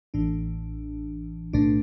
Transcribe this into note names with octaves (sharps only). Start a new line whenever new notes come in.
A1 A2 E3 D4
B1 A2 A3 D4